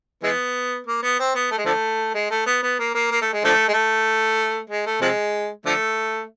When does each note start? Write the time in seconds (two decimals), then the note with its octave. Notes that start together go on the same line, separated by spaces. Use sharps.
0.23 E3 G#3 B3
0.87 A#3
1.03 B3
1.19 C4
1.35 B3
1.51 A3
1.58 G#3
1.66 D3 F3 A3
2.14 G#3
2.31 A3
2.46 B3
2.63 B3
2.79 A#3
2.94 A#3
3.11 A#3
3.21 A3
3.33 G#3
3.44 D3 F3 A3
3.68 G#3
3.74 A3
4.69 G#3
4.86 A3
5.01 C3 F3 G#3
5.66 D3 F3 A3